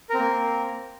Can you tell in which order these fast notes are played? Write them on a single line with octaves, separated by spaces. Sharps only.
A#4 C4 A#3